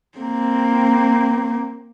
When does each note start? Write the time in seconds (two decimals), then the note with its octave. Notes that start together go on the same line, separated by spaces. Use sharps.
0.18 A#3 C4